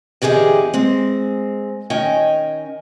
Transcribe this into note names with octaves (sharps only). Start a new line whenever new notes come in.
E2 D3 G4 G#4 D#5
G#3 C4
D#3 C#4 D#5 G5 G#5